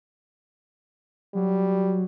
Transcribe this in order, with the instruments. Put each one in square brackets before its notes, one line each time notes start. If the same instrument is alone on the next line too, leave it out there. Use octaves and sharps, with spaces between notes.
[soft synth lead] F#3 [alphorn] G3